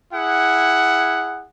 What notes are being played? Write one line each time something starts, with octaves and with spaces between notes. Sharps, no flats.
E4 G#4 F#5